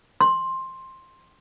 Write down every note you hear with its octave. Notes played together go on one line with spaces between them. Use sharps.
C6